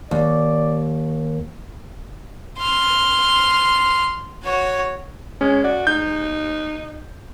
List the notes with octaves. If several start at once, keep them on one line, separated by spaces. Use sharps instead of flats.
D#2 D5
C6 F6
F#4 C#5
G#3 C#4
F#4 D5
D#4 G6